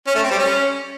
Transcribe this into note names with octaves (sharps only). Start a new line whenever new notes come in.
C#4
A3
C4
G3
C#4